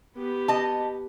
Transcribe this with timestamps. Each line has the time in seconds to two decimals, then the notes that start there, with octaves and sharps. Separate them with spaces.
0.16 B3 G4
0.48 D#5 A5